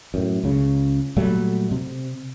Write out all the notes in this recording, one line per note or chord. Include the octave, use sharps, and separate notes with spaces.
F#2 A2
C#2 C#3
A#2 F#3 G3 A3
C3